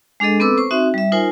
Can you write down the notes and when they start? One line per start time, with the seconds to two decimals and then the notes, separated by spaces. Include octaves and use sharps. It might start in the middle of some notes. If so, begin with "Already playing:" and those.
0.20 G#3 D4 G#4 A4 D#5
0.40 B3 C4 A4 B4 D6 E6
0.58 C5 C#6
0.71 C4 D#4 F#4 E5
0.94 G3 E5
1.12 D#4 F4 A#4 C5 G#5